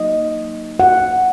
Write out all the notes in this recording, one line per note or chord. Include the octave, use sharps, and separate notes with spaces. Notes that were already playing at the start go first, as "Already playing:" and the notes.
Already playing: F#3 A#3 D#4 D#5
F#5